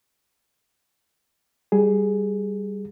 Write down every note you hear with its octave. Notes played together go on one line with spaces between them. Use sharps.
G3 G#4